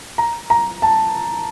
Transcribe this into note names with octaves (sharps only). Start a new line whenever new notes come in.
A#5
A#5
A5